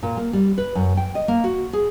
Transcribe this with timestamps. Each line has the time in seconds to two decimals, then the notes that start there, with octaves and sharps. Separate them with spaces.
0.03 A#2
0.17 A#3
0.33 G3
0.58 B4
0.75 F#2
0.97 G5
1.15 D#5
1.28 A#3
1.44 F#4
1.73 G#4